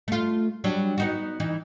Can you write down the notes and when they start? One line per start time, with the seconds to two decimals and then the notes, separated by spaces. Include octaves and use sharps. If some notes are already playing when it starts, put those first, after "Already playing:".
0.08 A3 F4
0.64 F#3 G3 D4
0.98 B3 D#4 F#4
1.40 E3 D#4